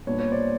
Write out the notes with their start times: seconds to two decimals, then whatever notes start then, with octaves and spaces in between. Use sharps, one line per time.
0.06 A#2 G3 B3 D4 C#5
0.20 C#5
0.32 C5 D5